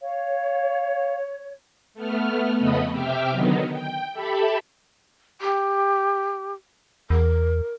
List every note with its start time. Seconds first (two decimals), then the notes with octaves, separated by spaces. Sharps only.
0.01 C#5 F5
1.94 A3 B3 F6
2.56 F2 C#3 A3 B3 D#5 B5
2.89 C3 E5 G5 D6 F6
3.30 D3 D#3 F#3 B3 D#4
3.72 G5
4.13 G4 A4 E5 B5
5.41 G4
7.10 E2 A#4